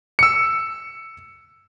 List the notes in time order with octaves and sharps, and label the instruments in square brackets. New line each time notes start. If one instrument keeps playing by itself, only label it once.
[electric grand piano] E6 C#7